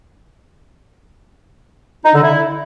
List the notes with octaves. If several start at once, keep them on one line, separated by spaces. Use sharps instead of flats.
D#4
D3
E4